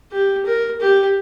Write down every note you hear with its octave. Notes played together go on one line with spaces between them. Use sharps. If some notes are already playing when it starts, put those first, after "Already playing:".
G4
A#4
G4